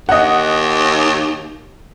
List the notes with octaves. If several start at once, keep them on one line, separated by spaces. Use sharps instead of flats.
D#2 D#5 F#5